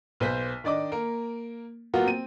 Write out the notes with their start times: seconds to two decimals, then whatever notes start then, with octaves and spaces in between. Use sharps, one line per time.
0.20 B1 B4 C5 B6
0.64 D#3 D4 D5 D#5 D6
0.92 A#3 A#4
1.94 F#3 A#3 B3 F4 F#4
2.06 C4 D#7